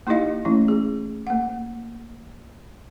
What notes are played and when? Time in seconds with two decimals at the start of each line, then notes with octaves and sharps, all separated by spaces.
0.07 A#3 D#4 E4 G4 D#5 F5
0.45 E3 A3 C#4 E4
0.68 G#4
1.27 A#3 F#5